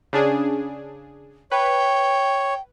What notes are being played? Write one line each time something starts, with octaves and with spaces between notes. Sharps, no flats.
C#3 D4 G#4
B4 C#5 G5